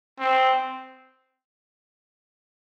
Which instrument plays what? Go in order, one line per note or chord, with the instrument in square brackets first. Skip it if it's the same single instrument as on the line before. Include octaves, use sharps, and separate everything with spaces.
[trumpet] C4